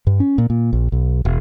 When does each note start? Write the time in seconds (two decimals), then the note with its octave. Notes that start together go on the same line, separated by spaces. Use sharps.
0.07 G2
0.20 C#4
0.38 A#2
0.50 A#2
0.73 A#1
0.92 B1
1.25 E1